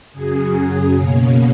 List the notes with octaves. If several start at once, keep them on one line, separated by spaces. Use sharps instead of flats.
F#2 C#3 F#3 G#4
B2 A#3 C#4